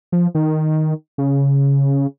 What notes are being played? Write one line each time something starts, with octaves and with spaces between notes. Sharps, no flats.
F3
D#3
C#3